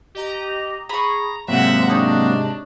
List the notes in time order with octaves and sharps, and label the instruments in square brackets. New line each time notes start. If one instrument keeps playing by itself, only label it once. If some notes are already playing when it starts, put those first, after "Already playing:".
[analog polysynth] G4 D#5 A#5
[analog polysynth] G#4 [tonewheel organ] A#5 [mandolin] B5 C#6
[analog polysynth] G#2 C3 G#3 [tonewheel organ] F#3 A#3 C4 [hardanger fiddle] E5 F#5
[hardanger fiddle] D4 [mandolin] D#4 C#5